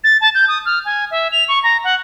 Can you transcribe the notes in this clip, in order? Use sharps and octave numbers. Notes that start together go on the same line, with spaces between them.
A6
A5
G6
D#6
F6
G#5
E5
F7
C#6
A#5
F#5